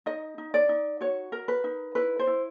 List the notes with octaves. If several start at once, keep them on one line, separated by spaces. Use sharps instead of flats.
D#4 D#5
D#4
D5
D#4
F#4 C#5
A#4
B4
D#4
E4 B4
C5
E4